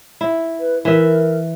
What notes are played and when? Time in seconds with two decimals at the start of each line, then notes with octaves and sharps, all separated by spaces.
0.21 E4
0.60 B4
0.85 E3 A#4 E5